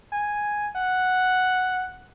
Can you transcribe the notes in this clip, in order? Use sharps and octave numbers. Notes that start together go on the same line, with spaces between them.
G#5
F#5